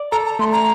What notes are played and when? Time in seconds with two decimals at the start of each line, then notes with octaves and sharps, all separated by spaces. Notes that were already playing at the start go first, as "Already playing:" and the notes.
Already playing: D5
0.12 A4 A#5
0.26 A#5
0.39 A3 C6
0.53 A#5